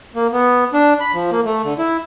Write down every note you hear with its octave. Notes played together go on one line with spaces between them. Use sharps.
A#3
B3
D4
B5
F3
A#3
A3
D3
E4